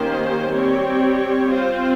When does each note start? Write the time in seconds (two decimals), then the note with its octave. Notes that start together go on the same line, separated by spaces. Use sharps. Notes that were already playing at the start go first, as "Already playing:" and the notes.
Already playing: D#3 A#3 C#4 G4 C5
0.49 G3 C4 G4 C#5
1.47 C4 F4 C5